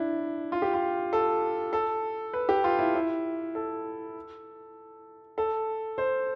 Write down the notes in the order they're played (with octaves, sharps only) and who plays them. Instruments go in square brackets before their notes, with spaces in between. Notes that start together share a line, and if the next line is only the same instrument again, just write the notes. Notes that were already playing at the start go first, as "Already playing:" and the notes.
Already playing: [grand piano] D4 E4
F4
G4
F4
A4
A4
B4
G4
F4
E4
E4
A4
A4
C5